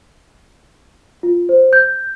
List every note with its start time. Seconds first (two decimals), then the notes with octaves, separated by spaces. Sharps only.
1.23 F4
1.49 C5
1.73 G6